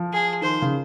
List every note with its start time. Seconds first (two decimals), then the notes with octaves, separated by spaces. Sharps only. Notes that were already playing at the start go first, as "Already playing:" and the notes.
Already playing: F3
0.13 G#4
0.41 D#3 C5
0.62 C#3